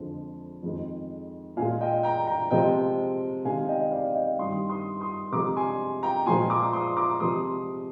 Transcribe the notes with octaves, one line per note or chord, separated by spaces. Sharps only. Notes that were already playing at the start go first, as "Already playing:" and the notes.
Already playing: F2 D3 F3 G#3
F2 D#3 G#3
A#2 F5 G#5
G#3
D#5 G5
G5 A#5
G5 A#5
C3 F3 G#3 D#5 G5
C3 D#3 G#3 F5 G#5
D#5 G5
D5 F5
F5
D#5 G5
G2 D#3 G3 C6 D#6
C6 D#6
C6 D#6
C3 F3 G#3 A#5 D6
G#5 C6
G5 A#5
A#2 F3 G#3 G#5 C6
A#5 D6
C6 D#6
A#5 D6
C3 F3 G#3 C6 D#6